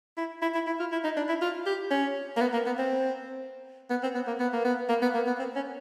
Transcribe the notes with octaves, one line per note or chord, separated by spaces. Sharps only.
E4
E4
E4
E4
F4
E4
D#4
D4
E4
F4
G4
C#4
A#3
B3
A#3
B3
C4
B3
C4
B3
A#3
B3
A#3
B3
A#3
B3
A#3
B3
C4
C#4